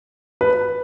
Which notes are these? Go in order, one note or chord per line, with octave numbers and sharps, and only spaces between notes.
B4